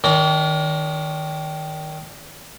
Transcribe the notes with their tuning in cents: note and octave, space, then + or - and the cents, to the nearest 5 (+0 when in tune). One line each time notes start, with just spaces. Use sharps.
D#3 +0 D4 -45